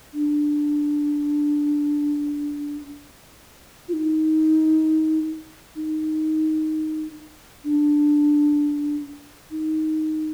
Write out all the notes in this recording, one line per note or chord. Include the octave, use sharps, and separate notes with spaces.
D4
F4
D#4
D#4
D4
D#4